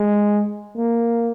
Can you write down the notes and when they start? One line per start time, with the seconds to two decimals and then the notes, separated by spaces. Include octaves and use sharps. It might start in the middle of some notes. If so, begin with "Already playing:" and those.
Already playing: G#3
0.77 A#3